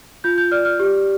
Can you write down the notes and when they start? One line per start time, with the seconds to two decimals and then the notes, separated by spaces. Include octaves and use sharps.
0.24 F4 G6
0.38 G6
0.52 D5 F6
0.65 F6
0.80 G4